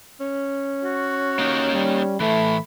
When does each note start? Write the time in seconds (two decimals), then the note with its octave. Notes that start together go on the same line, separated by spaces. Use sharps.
0.20 C#4
0.84 F#4
1.39 A#3 D#4 G4
1.73 G3
2.20 A2 E3 A3 B5